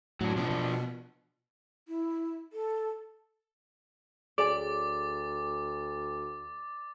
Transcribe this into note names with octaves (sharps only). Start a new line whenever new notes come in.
A2 F#3 D4
B2 F3 D4
B2
E4
A4
D2 G#4 D5 G#5 D6 A6